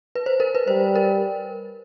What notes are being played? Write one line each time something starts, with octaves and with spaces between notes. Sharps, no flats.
B4
C5
A#4
B4
G3 C5
A#4